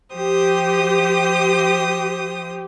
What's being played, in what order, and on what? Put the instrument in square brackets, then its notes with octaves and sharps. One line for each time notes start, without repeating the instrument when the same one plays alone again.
[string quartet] F3 C5 D#6 [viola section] G4